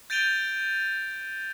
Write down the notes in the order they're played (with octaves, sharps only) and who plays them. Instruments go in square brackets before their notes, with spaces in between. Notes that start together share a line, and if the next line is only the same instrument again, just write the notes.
[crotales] G6 A6 D7 D#7 F7 G7